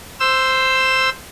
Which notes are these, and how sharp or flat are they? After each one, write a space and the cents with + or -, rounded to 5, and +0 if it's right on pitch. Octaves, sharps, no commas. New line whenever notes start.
C5 +0 E6 +10